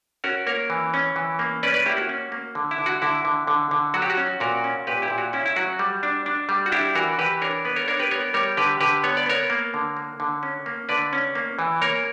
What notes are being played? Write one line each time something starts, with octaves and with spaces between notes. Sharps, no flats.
C#4 F#4 A#4
A#3 A#4 C#5
E3
C#4
E3
A#3
C#4 B4 D5
B4 D5
A#3 E4 G4
F#4
C#4
A#3
D3
E4
D3
F#4
D3 E4
D3
D3
D3
F#3 F#4
G4
F#4
C#4
A#2 F#4 A#4
C#4
A#2 G4 B4
E4 G4
A#2
F#4
C#4 E4
E4
F#3 F#4
G3
D4
D4
G3
F#4
D4 E4 G4
E3 F#4 A#4
E3 G4 B4
D4 A#4 C#5
B3 B4
A#4 C#5
D4 A#4 C#5
G4 B4
B3 A#4 C#5
G3 A#4 C#5
D3 G4 B4
D3 G4 B4
B3 C#5
D5
B3 A#4 C#5
A#3
D3
A#3
D3
C#4
A#3
D3 B4 D5
C#4
A#3
E3
A#3 A#4 C#5